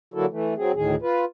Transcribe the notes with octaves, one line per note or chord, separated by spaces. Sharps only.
D3 F#3 A#3 E4 F#4 A4
E3 A3
F#3 C4 G#4
D2 A2 D#3 G#4
F4 B4